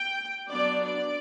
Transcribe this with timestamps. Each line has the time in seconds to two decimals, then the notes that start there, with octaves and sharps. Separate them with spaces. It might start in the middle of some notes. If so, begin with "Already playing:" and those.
Already playing: G5
0.49 F#3 B3 D4 D5
0.85 D5